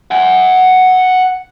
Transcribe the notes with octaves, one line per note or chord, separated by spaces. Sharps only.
F#5 G#5